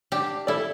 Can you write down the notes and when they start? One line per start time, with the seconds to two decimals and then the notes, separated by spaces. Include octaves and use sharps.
0.12 D4 G4
0.47 E4 A4 D5